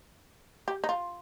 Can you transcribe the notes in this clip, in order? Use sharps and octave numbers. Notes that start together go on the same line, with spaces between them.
G4
D#4
F4